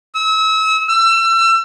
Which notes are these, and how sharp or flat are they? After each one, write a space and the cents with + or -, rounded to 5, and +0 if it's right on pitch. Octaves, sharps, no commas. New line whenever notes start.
E6 -35
E6 +30